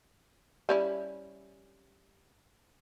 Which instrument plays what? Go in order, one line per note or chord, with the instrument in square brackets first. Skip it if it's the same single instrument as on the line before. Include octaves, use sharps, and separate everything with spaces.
[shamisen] G3 C#4 E4